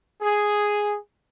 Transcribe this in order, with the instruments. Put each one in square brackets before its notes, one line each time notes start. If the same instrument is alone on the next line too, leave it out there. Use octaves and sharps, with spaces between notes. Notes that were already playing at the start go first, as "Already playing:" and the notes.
[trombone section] G#4